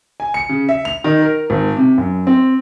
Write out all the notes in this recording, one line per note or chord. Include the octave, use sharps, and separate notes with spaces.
G#5
C#7
C#3
E5
F7
D#3
A#4
G#1
C3
F#2
C4